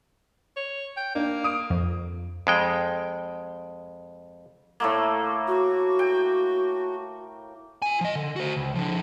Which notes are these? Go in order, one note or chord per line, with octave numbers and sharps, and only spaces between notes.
C#5
G5
A#3 D4
D#6 D7
F2
F2 G#3 G5
A2 A3 A#3
F#4
G5
F4 G#5
F3 D#5
D3
F#4 C5
C#2
D3 F3